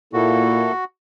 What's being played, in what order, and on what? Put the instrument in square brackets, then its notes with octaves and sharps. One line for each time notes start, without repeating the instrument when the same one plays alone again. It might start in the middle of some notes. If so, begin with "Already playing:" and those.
[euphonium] A#2 [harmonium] A#3 E4 A4 [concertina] F#4